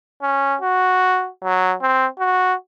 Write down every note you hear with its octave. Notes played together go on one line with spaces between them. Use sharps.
C#4
F#4
F#3
C4
F#4